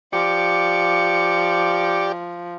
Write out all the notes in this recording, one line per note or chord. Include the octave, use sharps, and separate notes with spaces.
F3 G4 D5 C#7